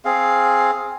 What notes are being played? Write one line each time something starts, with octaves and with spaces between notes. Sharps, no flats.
C4 G#4 F5